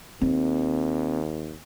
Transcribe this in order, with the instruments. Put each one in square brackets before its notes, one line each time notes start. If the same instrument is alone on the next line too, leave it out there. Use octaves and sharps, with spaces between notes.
[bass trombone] D#2 [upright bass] C4